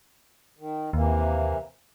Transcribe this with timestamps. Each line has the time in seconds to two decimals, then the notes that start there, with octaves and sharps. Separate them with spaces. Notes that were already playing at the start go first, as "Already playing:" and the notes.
0.59 D#3
0.93 D#2 C3 E3 A#3